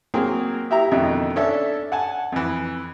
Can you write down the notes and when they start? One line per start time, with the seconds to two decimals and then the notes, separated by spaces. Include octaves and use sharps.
0.14 F#3 A#3 C4 G#4 A#4
0.71 E4 G4 E5 A#5
0.91 F2 B2 D3 D#3 A3 E4
1.36 C#4 D4 A4 D5 E5
1.92 F#5 G#5 A5
2.32 F2 E3